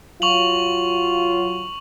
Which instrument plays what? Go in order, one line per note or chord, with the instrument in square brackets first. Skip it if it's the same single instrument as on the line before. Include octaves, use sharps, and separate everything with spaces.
[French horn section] F#3 F4 [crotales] C#6 F7 F#7